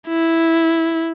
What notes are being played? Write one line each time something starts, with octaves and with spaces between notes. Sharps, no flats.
E4